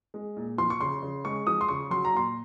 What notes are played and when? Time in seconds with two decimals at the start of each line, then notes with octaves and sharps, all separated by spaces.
0.14 G#3
0.37 A#2
0.58 F3 C6
0.70 C#6
0.81 C#3 C6
1.03 C#3
1.25 G#3 C#6
1.47 F3 D#6
1.61 C6
1.69 C#3 C#6
1.90 F#3 C6
2.05 A#5
2.13 A#2 C6